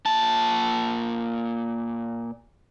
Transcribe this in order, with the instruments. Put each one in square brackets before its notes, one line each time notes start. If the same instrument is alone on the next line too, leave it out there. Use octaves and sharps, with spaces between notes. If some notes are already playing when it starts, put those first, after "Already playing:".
[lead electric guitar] A#2 A5